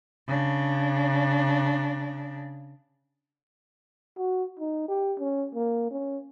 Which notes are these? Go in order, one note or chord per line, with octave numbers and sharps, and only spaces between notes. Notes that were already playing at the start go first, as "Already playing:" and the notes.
C#3 D4
F#4
D#4
G4
C#4
A#3
C#4